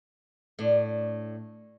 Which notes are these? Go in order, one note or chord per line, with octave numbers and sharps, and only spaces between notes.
A2 D4